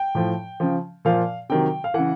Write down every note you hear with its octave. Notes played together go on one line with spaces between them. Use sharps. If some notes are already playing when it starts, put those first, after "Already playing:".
Already playing: G5
A2 F3
C#3 F3
A#2 F3 F5
C3 D#3 F#3 G5
F5
C#3 E3 F#5